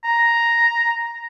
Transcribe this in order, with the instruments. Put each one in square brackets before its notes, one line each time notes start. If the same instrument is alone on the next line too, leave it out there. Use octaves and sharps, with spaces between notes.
[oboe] A#5